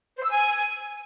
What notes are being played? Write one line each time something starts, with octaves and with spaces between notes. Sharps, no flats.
C5
E6
G#5